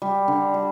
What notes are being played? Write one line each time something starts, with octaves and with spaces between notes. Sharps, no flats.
G3
D3
G3